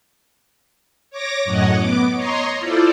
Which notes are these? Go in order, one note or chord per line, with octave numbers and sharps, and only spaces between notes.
C#5 D6 A#6
F#2 A2 C#5 D#5 F#5
B3 D6
C#5 D#5 A#5 C6
E4 F4 A4 C5 D5